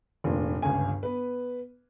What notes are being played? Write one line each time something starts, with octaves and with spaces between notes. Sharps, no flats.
F1 G2 A#2
G1 C#2 G2 G#5
B3 B4